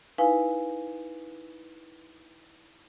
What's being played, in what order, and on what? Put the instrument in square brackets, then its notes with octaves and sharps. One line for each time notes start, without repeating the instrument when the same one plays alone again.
[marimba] D#4 E4 B4 F5 G#5